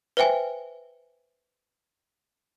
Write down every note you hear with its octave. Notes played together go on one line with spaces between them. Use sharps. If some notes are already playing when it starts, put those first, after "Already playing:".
B4 C5 E5 G5 G#5